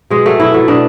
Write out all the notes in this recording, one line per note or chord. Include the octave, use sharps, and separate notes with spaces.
B2 G#3
F#3 A3
B2 E4
F#3 A3
B2 D4